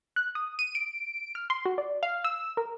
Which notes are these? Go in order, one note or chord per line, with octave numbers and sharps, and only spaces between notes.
F#6
D#6
D#7
D7
F6
C6
F#4
D5
F5
E6
A#4